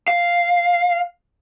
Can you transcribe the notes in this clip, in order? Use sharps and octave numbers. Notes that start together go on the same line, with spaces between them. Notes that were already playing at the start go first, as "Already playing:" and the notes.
F5